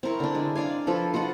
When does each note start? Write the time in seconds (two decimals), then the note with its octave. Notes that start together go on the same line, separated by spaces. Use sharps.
0.03 C4 E4 A#4 C#6
0.20 D3 D4
0.35 G#3
0.56 D4 D5 F5 G#5
0.87 F3 A4 B4
1.14 F4 F#4 D#5 F#5